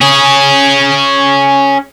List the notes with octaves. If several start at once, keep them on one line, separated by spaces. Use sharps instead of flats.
C#4 G#4